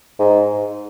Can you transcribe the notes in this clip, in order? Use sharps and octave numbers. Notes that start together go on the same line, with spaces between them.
G#2